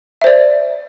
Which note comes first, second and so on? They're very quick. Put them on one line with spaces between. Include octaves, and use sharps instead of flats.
E5 C5 D5